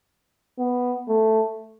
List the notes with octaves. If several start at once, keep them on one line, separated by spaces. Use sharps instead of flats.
B3
A3